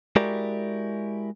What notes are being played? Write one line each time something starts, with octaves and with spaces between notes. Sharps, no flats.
G#3 E4 F#4 G4 A#4 D5